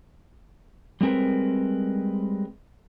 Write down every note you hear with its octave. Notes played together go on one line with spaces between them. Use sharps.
G3 G#3 C4 A#4 B4